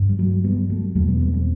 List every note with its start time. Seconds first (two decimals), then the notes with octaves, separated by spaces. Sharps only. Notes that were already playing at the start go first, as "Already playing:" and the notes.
Already playing: G2
0.09 G3
0.19 F#3 A3
0.44 G3 B3
0.70 F#3 A3
0.95 E2 B2 F#3 A3
1.08 G3 B3
1.21 G3 B3
1.34 A3 C4